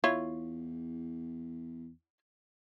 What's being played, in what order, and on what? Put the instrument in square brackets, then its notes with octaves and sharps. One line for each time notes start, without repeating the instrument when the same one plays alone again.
[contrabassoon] E2 [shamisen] E4 F4 C#5